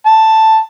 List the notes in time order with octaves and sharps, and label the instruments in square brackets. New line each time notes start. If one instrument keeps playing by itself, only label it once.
[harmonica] A5